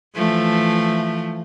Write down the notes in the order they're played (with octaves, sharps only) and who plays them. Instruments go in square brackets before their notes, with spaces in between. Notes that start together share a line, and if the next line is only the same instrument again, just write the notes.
[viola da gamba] E3 F3 A3